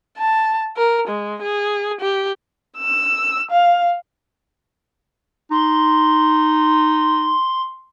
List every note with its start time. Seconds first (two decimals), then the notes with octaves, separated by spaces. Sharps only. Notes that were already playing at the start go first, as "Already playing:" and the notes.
0.18 A5
0.77 A#4
1.08 G#3
1.42 G#4
2.01 G4
2.78 E6
3.51 F5
5.51 D#4 C6